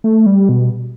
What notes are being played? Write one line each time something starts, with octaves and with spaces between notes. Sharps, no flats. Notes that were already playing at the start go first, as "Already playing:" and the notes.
A3
G3
B2